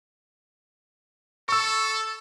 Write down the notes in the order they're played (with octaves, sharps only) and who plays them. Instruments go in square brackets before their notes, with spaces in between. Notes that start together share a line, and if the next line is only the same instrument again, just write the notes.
[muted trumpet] A4 [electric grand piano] C#6 E6